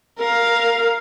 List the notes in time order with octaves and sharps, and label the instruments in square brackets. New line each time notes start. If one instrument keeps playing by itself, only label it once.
[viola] A#4 F5